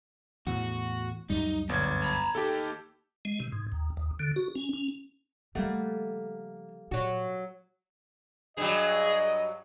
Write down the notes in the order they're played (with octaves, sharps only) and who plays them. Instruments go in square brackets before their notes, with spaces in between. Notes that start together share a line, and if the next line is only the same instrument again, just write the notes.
[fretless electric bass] E2 A2 [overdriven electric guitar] F#4
[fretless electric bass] C#2 F#2 G3 [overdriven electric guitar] D#4
[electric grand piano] G1 G#6 [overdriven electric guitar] A#2
[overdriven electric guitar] A#5 B5
[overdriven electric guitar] D#3 A#3 [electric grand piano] G4 A4
[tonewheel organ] G#3
C3
G#2
D#2
D#2
D3
F#4
C#4
C#4
[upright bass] C#3 F3 [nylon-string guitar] G3 A#3 F#5 [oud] A3
[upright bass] A#2 [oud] F#3 F#4
[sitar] G2 F#3 [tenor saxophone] G#4 [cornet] D#5